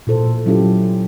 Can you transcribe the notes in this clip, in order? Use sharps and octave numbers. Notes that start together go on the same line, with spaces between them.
A#2 E4 A4 C5
F#3 C#4 E4 F4 G4 A4